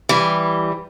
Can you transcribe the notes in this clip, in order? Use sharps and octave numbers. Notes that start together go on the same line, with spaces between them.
E3 G3